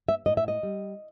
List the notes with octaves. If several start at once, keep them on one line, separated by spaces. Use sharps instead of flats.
E5
A2 D#5
E5
D#5
G3